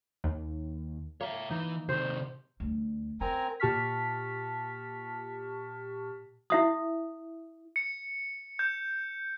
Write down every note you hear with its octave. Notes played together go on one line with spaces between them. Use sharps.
D#2
A#3 C#5 E5
E3 D#4
C3 D#3 C5
D2 G3
C4 C#4 A#4 G#5 A#5
A#2 G4 A5 C#6 F6 B6
E4 E5 D#6
C#7
G6